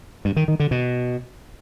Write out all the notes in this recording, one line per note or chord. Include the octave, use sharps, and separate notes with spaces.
G2
D#3
D#3
D3
B2